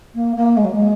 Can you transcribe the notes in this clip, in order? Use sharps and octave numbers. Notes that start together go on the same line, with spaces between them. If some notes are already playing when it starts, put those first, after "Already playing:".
A#3
A#3
G#3
F#3
G#3